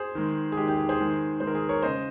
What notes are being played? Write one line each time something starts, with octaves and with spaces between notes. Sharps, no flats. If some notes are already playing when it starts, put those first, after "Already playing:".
Already playing: G#4 C5
D#3 G#3
G#4
D#3 G#3 G4
G4
G#4
G#4 C5
D#3 G#3
D#3 G#3 C5
A#4
G#4
A#4 C#5
C#3 G#3 C5 D#5